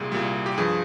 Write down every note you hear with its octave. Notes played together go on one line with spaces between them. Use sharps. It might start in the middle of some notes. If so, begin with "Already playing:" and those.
Already playing: C2 A#2 G3 G#4
C2 A#2 G3
G4
G2 F3 G#4